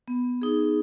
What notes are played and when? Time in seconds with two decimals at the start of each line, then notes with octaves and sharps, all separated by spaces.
0.08 B3
0.42 D#4 G#4